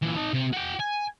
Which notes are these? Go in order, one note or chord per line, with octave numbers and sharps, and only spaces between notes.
A#2 E3
D#4 A5
C3
F#4 G5
G#5